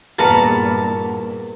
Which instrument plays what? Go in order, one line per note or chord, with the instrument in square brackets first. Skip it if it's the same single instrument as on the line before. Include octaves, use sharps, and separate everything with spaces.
[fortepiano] E2 [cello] G2 A#2 [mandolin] F#4 F5 A5 [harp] A#4 B4